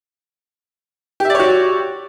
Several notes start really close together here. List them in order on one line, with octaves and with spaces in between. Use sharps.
G4 E5 D5 C#5 F#4